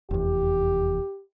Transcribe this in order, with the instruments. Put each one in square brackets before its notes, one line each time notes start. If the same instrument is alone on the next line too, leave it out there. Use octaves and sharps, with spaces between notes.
[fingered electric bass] F1 E2 [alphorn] G4